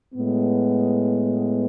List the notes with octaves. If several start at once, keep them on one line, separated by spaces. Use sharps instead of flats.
A2 G#3 B3